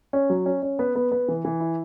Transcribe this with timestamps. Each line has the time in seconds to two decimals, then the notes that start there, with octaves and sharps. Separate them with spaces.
0.13 C#4
0.30 F#3
0.46 C#4
0.62 C#4
0.79 B3
0.96 B3
1.12 B3
1.28 E3
1.45 E3
1.60 E4